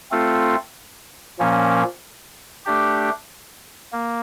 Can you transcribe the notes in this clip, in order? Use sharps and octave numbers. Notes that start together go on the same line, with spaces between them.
A3 C4 F4 A4
A#2 F3 A#3 C#4
A3 D4 G4
A#3